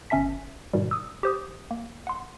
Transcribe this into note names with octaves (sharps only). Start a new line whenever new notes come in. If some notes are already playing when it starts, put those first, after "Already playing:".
G1 C#4 E5 A5 B6
G#2 B2 D#3 G3
D#6 E6
G4 C5 D#6
A#3
F#5 C6